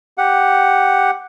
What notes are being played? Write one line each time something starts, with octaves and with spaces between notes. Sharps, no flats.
G4 F#5